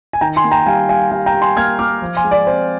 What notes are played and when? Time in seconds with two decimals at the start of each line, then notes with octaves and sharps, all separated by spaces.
0.13 G#5
0.21 D#3 G5 A#5
0.36 G#5 C6
0.44 A#3
0.51 G5 A#5
0.66 G3 F5 G#5
0.89 G3 F5 G#5
1.11 G3 F5 G#5
1.26 G5 A#5
1.34 G3
1.41 G#5 C6
1.57 A#3 F6 G#6
1.79 A#3 D6 F6
2.02 F3
2.17 G#5 C6
2.24 G#3
2.31 D5
2.47 C4 C5